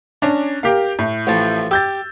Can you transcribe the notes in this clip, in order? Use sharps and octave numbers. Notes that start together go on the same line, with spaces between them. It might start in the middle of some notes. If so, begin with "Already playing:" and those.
C#4 D4 A#5
G4 A#4 F5
A2
A1 F3 A5
G4 E6 G6 A6